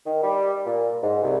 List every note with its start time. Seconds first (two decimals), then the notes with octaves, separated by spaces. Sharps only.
0.06 D#3
0.23 G3
0.65 A#2
1.03 G#2
1.23 C2